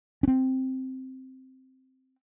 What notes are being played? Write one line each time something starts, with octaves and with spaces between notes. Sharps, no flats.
C4 C#4